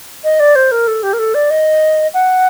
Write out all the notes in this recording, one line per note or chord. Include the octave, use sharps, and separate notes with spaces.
D#5
D5
C5
A#4
A4
G4
A#4
A4
D5
D#5
F#5